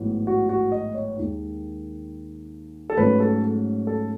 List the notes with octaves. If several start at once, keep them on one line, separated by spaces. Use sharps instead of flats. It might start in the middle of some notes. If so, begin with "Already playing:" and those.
Already playing: A1 G#2 F#3 B3 E4
F#4
F#4
D#5
C#5
D#2 D#3 G#3 D#4
A4
G#2 F#3 A3 C#4 B4
A4
A4